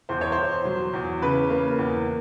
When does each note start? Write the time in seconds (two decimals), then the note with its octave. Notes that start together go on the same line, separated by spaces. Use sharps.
0.09 E2 C5
0.21 C#5
0.32 C5
0.38 E2
0.65 F#3
0.94 E2
1.22 C#3 B4
1.50 A#3
1.79 E2